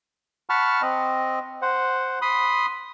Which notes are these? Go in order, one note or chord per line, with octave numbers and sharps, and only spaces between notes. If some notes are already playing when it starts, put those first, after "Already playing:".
F#5 A5 B5 C#6 F6
C4 D#5
C5 F#5
B5 C6 D#6